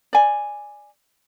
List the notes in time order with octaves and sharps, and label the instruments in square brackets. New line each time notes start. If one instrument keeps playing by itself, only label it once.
[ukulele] D5 G#5